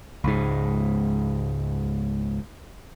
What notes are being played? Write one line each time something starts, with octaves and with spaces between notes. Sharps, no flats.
C#2 G#2